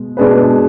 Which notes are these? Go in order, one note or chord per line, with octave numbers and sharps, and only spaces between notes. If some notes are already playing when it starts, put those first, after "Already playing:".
Already playing: B2 G#3
B2 G#3 D4 G#4 B4